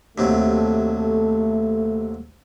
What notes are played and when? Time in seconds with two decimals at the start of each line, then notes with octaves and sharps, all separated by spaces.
0.18 D#2 C3 F#3 A3